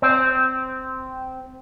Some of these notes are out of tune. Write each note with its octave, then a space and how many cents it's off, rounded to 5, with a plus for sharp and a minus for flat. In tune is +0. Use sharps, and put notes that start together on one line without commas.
C4 -10